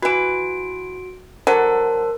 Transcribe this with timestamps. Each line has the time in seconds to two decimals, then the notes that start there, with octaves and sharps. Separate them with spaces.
0.02 E3 F#4 B4 D7
1.47 D3 F#3 A4 A#4 C5